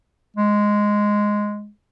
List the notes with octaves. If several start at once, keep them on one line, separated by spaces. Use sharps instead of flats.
G#3